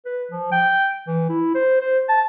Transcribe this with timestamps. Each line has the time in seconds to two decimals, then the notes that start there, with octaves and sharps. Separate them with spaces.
0.05 B4
0.32 F3
0.52 G5
1.07 E3
1.29 E4
1.55 C5
1.81 C5
2.09 A5